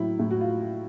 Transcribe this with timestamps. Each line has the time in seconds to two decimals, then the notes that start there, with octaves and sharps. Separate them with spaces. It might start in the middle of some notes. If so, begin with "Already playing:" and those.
Already playing: A2 F#3 E4
0.19 A2
0.31 F#4
0.40 F4